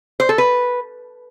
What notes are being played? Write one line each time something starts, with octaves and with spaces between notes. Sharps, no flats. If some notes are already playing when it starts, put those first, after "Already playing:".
C5
A4
B4